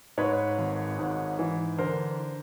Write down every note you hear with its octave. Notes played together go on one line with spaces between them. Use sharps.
G#2 B4 C#5
G#1
G#2
E3
D3 A#4 C5